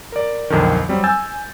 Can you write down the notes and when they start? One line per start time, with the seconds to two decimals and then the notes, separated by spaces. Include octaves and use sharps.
0.12 A#4 D5
0.50 B1 F2 D3 D#3
0.89 F#3 G3 C4
1.04 G#5 E6 G6 A6